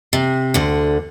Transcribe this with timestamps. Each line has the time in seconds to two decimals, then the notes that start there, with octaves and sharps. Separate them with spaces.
0.13 C3
0.54 D2 D3